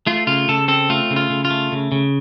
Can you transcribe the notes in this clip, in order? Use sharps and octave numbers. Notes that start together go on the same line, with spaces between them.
A3 F4
C#3 F4
C#3 A4
C4 A4
A3 F4
C#3
F4
C#3
F4
A3
C#3
C#3